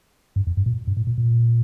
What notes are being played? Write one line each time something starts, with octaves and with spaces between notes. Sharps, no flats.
G2
F2
G2
A#2
G2
A2
A#2
A#2